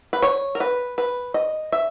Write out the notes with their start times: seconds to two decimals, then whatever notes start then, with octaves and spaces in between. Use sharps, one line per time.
0.13 B4
0.22 C#5
0.55 A#4
0.60 B4
0.98 B4
1.34 D#5
1.72 E5